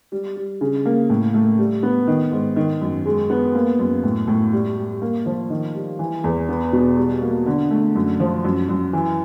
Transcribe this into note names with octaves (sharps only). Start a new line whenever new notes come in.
G3
G3
C#3
A#3
A2
A3
G3
B3
D#3
G#2
D#3
F#2
G#3
B3
A#3
F#2
A2
A2
G3
G3
A#3
F3
D#3
G3
E3
E2
B3
B2
G3
A#3
D3
A3
F#2
F3
F#2
F#2
E3